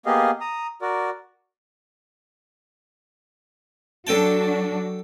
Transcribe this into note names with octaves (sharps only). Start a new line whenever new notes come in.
A#3 B3 G4 G#4 D#5 F5
A#5 D#6
F#4 A#4 D5
F#3 D4 F#4 A4 G5 A5